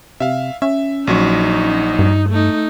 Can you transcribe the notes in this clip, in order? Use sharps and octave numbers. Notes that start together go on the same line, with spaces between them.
C3 E5 F5
C#4 E5
A#1 F#3 D#4 C#6
G2
A3 D#4